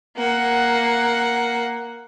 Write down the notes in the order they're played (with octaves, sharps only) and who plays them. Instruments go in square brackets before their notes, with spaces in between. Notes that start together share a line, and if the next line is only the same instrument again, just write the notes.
[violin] A#3 F#5